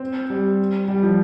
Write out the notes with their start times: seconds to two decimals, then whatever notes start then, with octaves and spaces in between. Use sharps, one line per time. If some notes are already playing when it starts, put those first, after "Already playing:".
Already playing: C4
0.30 G3
0.88 G3
1.03 F3